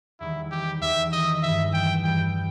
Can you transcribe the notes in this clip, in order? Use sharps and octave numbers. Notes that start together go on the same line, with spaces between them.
E2 D#3 G3 E4
G4
E2 D#3 G3 E5
D#5
G2 E3 G3 E5
G5
G2 E3 G3 G5